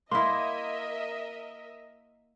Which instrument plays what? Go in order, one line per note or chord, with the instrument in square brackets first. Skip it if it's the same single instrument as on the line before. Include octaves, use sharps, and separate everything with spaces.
[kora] A#3 E4 [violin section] A#4 D#5 E5 [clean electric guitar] C6